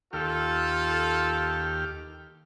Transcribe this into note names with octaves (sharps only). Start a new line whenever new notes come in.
D#2 F4 G4 A4 F6